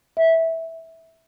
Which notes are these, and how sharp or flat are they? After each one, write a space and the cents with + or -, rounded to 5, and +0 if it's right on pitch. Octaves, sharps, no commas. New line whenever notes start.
E5 -10